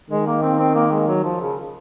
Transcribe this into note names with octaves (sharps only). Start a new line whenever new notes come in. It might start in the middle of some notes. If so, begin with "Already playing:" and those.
D#3 G#3
A#3
C4
C4
A#3
G#3
F#3
F3
C#3